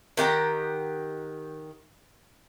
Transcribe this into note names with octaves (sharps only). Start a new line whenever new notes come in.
D#3 G4 F#5 A#5